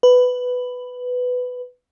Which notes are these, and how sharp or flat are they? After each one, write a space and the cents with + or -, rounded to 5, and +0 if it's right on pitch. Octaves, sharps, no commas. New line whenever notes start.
B4 +10